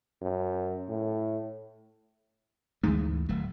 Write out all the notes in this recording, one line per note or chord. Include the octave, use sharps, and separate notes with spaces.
F#2
A2
D2 G#2 E3 A3
D1 F#3 A3